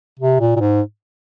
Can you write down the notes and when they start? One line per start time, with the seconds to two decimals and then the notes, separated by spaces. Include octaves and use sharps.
0.19 C3
0.40 A#2
0.56 A#2
0.60 G#2